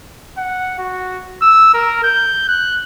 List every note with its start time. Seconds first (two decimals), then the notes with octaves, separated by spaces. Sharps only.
0.38 F#5
0.79 F#4
1.42 E6
1.74 A#4
2.04 G6
2.48 F#6